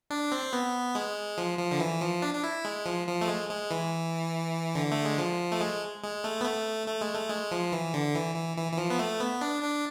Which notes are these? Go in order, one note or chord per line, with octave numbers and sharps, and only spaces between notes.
D4
C4
B3
G#3
F3
F3
D3
E3
F3
D4
D4
E4
G#3
F3
F3
A3
G#3
G#3
E3
D3
A3
G#3
F3
A3
G#3
G#3
A3
B3
A3
A3
G#3
A3
G#3
F3
E3
D3
E3
E3
E3
E3
F3
B3
A3
B3
D4
D4